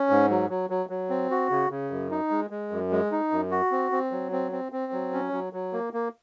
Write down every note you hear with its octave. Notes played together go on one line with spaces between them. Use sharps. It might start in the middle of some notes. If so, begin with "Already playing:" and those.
Already playing: C#4
G#2
F#3
F#3
F#3
F#3
C4
F#4
C#3
C#3
F#2
D#4
G#3
G#3
F#2
G#3
D#4
F#2
F#4
C4
C4
F#3
C4
C4
C4
F#3
C#4
F#3
F#3
A#3
A#3